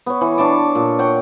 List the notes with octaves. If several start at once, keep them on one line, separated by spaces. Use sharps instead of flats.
B3 C#5
E3
D4 C#5 A5 D6
A#2
C#5 F#5 G5